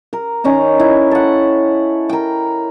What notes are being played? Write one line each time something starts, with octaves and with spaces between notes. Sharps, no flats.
A#4
D#3 C#4 D#4 A#5
E4
A4 F#5
A#4 G5